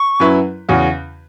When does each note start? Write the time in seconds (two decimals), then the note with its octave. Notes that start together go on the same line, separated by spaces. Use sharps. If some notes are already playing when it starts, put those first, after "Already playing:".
Already playing: C#6
0.20 F#2 F#3 E4 B4
0.69 E2 C#3 E3 C#4 F#4